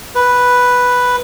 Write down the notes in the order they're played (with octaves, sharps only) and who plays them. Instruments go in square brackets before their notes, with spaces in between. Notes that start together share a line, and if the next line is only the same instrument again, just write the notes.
[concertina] B4